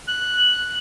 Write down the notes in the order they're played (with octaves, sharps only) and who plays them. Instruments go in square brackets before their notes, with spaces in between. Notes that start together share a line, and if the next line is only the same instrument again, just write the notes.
[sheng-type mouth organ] F#6